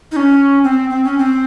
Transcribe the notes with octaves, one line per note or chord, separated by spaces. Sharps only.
D#4
C#4
C4
C4
C#4
C4